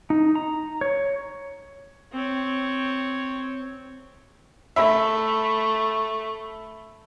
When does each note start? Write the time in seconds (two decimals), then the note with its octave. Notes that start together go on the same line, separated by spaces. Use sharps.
0.10 D#4
0.35 A#5
0.81 C#5
2.13 C4 C#5
4.76 A3 E5 B5